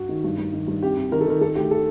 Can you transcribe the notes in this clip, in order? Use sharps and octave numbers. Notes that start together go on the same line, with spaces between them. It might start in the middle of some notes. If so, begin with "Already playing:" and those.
Already playing: G2 F#4
D#3
G2
G2
D#3
G2
C2 G4
C2
D#3 A#4
A4
D#3 A#4
D#3 A4
D2 G4
A4